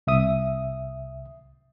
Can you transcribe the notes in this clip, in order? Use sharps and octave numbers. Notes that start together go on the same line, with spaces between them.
C2 E5 D#6